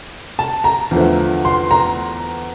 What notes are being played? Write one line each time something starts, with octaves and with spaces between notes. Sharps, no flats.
A5
A#5
E2 D3 F3 A3
C6
A#5